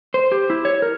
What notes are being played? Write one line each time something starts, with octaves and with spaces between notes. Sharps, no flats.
C5
G4
E4
C#5
A#4